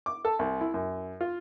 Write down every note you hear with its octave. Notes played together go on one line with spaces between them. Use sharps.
D6
A4
C2
E4
F#2
F4